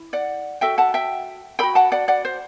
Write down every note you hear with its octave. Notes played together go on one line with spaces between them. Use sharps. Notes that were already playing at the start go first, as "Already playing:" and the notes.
Already playing: E4
D5 F#5
F#4 A4 E5 G5
F#5 A5
E5 G5
F#4 A4 G5 B5
F#5 A5
D5 F#5
D5 F#5
C5